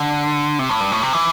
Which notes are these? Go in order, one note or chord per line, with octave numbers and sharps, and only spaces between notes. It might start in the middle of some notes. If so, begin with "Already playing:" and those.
Already playing: D3
C3
A2
G2
A2
C3
E3